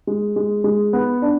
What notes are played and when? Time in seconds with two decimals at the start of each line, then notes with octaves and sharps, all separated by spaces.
0.07 G#3
0.36 G#3
0.64 G#3
0.93 B3
1.22 D4